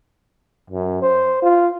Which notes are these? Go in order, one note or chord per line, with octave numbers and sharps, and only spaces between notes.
F#2
C5
F4